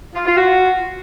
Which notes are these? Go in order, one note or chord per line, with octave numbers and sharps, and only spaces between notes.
F4
F4
F#4